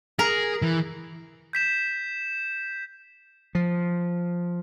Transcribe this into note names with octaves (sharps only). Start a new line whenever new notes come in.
G#4 A#4
E3
G6 B6 E7
F3